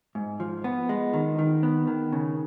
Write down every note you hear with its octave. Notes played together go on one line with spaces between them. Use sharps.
G#2
F3
B3
G#3
D#3
D#3
B3
D#3
C#3